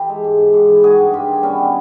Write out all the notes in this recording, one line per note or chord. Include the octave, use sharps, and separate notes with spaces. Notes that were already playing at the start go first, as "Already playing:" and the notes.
Already playing: E3 G4 A4
G#3
G#2
G#2
G#2
E3
G3 F#4 G#4
G2
G2 F4 G4
D#3
G3 B3 C#4
G3